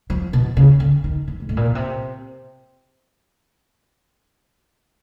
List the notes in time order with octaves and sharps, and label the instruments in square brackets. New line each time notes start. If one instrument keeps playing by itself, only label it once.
[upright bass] F3
B2
C#3
D3
D#3
E3
G#2
A2
A#2
B2
C3